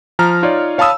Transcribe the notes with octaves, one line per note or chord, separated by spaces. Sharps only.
F3 A#5 F6
D#4 F4 C#5 D5
C#5 F5 A5 B5 D#6 E6